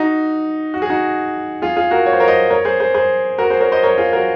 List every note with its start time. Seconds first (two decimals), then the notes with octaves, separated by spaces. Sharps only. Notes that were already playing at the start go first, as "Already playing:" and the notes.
Already playing: D#4 F#4
0.74 F#4
0.82 G#4
0.90 D#4 F#4
1.62 F4 G#4
1.77 F4 G#4
1.91 F#4 A#4
2.06 C#5
2.13 C5
2.20 A#4 C#5
2.28 C5 D#5
2.50 A#4 C#5
2.65 G#4 C5
2.80 G#4 C5
2.94 G#4 C5
3.38 F#4 A#4
3.50 G#4 C5
3.61 A#4 C#5
3.72 C5 D#5
3.83 A#4 C#5
3.98 F4 G#4
4.13 F#4 A#4